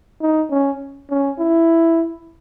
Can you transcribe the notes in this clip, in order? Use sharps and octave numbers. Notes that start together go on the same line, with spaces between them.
D#4
C#4
C#4
E4